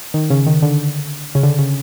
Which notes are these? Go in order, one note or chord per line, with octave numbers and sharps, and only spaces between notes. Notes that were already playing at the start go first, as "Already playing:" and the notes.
D#3
C#3
D#3
D3
C#3
D3
C#3